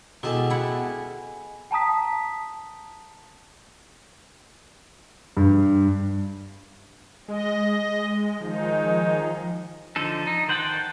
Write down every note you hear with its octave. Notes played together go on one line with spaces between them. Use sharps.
B2 G#3 E4 G4 A4 F#5 G#5
E4 F#5 G#5
G5 A5 A#5 D#6 B6
G2
G#3 D#5
D#3 F3 G#3 D#4
D3 F3 D#4 A4
D#4
D#3 C5 F#5 G5 A5